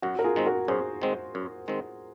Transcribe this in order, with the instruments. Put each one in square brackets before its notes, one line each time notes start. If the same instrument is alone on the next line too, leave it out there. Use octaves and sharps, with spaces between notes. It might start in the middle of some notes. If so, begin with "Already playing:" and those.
[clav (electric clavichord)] F#2 [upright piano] F#4
[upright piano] A#4
F4 G#4
[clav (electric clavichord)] D#3 G#3 C4
[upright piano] F#4 A#4
[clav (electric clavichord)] F#2 [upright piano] G#4 C5
[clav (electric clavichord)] D#3 G#3 C4
F#2
D#3 G#3 C4